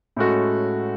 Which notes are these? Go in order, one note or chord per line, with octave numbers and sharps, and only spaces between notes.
A2 G#3 C#4 F#4 A4